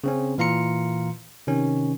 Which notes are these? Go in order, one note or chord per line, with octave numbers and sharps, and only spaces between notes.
C#3 C4 C#4
A#2 E3 F5 A#5 C6 C#7
C3 D#3 C#4